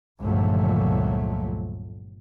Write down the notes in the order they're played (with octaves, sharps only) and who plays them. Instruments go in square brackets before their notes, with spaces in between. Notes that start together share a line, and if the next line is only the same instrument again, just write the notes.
[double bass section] G1 C#2 A#2 F3 F#3 A3